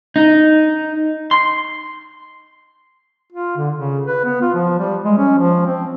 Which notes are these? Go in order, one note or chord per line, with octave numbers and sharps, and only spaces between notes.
D#4
C6
F4
D3
C#3
B4
B3
F4
F3
G3
G#3
C#4
F3
C4